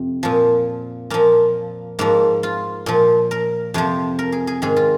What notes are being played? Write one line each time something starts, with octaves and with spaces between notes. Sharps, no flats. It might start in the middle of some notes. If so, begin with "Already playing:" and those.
Already playing: F2 C3
A#2 F3
A#2 F3 A#3
G#2 F3 A#3
F4
A#2 F3
A#4
F2 C3 F3 C5
A#4
G#4
G#4
G#2 D#3 G#4
F4